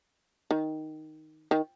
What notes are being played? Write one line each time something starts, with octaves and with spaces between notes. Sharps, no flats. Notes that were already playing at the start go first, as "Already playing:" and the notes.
D#3
D#3